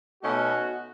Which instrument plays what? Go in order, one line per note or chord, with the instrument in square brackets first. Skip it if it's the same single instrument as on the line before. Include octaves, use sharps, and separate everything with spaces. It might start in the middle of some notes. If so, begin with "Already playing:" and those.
[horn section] B2 A3 C#4 D#4 F#4